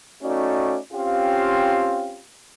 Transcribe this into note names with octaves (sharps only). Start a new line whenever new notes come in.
A3 C#4 D#4 F#4 D5
C4 C#4 F4 G4 F5